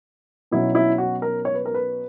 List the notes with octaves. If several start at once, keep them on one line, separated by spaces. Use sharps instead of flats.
B2 F#3 C#4 E4
E4
F#4
A#4
C#5
B4
A#4
B4